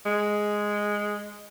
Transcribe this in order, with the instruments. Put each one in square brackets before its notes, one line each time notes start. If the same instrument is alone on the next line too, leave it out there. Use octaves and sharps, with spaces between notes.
[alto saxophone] G#3